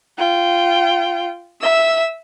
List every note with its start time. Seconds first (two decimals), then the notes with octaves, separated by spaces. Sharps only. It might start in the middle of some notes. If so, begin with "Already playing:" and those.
0.18 F4 G5
1.61 E5 E6